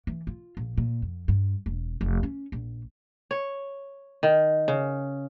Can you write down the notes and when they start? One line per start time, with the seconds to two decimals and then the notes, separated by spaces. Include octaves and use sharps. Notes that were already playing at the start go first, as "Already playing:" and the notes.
0.07 E3
0.27 F4
0.57 A#1
0.78 A#2
1.02 F2
1.28 G2
1.66 E1
2.01 F1
2.23 C#4
2.52 A#1
3.31 C#5
4.23 D#3
4.68 C#3